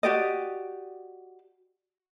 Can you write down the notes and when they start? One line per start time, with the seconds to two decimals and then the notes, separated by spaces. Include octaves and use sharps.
0.03 F#4 G4 D5 D#5